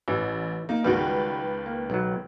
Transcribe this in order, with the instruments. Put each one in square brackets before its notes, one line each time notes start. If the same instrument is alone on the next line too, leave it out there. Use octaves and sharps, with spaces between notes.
[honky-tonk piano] A1 [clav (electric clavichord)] E3
[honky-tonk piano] A#3 [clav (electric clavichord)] D#4
[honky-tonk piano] C#2 D#3 B4 [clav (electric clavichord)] G3 F#4
[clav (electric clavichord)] A#3
B1 F#3